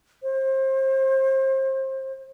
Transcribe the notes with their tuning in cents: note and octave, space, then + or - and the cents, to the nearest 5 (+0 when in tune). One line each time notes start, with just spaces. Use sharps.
C5 +30